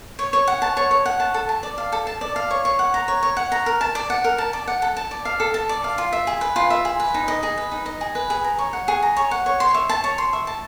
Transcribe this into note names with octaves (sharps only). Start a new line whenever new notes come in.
C#5
C#5
F#5
A5
C#5
C#5
F#5
A5
A4
A5
D5
F5
A4
A5
D5
F5
C#5
C#5
F#5
A#5
C#5
C#5
F#5
A#5
A#4
A5
D5
F#5
A#4
A5
D5
F#5
A4
A5
D5
F5
A4
A5
D5
F5
F4
E5
G#4
B4
F4
E5
G#4
B4
D#4
D#5
G#4
B4
D#4
D#5
G#4
B4
G#4
A#5
C#5
F#5
G#4
A#5
C#5
F#5
C#5
C6
E5
A5
C#5
C6
E5
A5